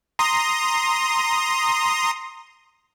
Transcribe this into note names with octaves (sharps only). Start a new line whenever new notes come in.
A#5 C6 D#6